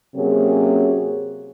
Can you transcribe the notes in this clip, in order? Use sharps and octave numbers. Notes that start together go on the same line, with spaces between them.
C3 F#3 A#3 C#4 G#4